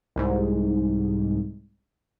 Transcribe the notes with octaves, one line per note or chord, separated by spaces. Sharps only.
C2 G#2